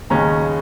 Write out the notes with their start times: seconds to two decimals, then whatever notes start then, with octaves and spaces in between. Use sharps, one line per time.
0.10 D#2 C#3 G#3 C#4 A#5